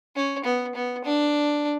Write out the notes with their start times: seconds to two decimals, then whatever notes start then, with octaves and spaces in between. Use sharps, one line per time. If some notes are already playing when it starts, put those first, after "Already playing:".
0.16 C#4
0.45 B3
0.75 B3
1.05 D4